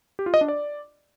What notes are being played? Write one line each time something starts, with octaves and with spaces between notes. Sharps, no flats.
G4
F4
D#5
D4
D5